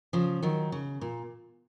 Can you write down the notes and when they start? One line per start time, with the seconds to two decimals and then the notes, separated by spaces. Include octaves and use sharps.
0.13 C#3 F3
0.43 D#3 F#3
0.72 C#3
1.01 A#2